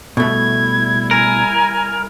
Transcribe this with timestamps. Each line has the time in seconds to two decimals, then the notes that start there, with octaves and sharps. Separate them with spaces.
0.17 B2 G3 A3 E4 G#6
1.11 A#4 G#5